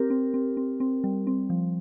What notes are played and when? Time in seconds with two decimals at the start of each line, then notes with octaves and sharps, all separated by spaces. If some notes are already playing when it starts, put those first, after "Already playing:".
Already playing: C4 G4 A#4
0.10 C4
0.34 C4
0.57 C4
0.80 C4
1.04 G3
1.27 C4
1.50 F3